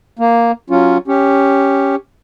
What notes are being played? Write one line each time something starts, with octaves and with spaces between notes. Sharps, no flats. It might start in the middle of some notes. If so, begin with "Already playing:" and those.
A#3
F#3 C#4 F4
C#4 G4